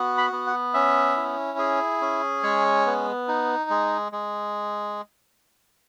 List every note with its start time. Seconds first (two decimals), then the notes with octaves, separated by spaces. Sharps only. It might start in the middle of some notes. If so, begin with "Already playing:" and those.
Already playing: B3 F#4
0.18 B5
0.32 B3
0.47 F#5
0.74 C#4 E5
1.17 E4
1.58 G#4
2.01 C#4
2.43 G#3 C#5
2.86 B3
3.28 D#4
3.70 G#3
4.12 G#3